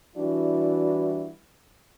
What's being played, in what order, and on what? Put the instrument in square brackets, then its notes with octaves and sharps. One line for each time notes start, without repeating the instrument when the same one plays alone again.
[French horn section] E3 G3 D4 E4 F#4